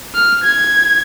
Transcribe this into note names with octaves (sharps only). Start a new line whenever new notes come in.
F6
G#6